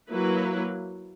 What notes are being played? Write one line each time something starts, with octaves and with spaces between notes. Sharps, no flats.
F#3 A#3 E4 B4